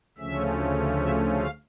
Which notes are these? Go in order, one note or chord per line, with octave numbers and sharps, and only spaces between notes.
D2 C#3 F3 A3 C#4 E5
E5
F5